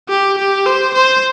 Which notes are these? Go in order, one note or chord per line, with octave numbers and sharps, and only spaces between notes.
G4
G4
C5
C5